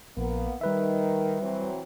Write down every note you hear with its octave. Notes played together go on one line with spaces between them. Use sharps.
A#1 A#3 B3
D#3 G3 B4 E5
E3 F#3 C4